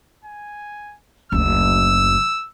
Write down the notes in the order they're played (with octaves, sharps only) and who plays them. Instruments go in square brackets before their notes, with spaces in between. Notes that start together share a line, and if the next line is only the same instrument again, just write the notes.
[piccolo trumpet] G#5
[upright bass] F#1 D2 [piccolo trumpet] E6